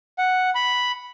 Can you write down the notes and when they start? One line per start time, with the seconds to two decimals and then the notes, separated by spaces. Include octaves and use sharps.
0.19 F#5
0.55 B5